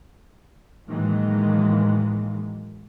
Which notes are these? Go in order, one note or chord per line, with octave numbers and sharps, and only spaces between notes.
A2 D#3 E3 F#3 G#3 A#3